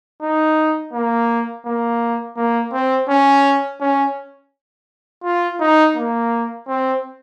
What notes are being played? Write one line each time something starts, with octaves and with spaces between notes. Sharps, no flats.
D#4
A#3
A#3
A#3
C4
C#4
C#4
F4
D#4
A#3
C4